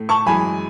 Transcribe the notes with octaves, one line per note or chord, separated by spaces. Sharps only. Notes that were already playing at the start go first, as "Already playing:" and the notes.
Already playing: A2 A3
A5 C#6
F#2 E3 G#3 G#5 B5